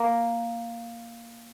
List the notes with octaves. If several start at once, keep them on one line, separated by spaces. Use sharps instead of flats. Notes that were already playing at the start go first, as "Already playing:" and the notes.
Already playing: A#3